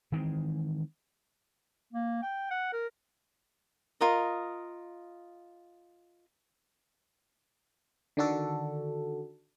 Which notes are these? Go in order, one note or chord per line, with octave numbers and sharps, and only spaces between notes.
D#3 E3 G#3 C4
A#3
G5
F#5
A#4
F4 A#4 D#5
D3 D#3 D4 F#4 A4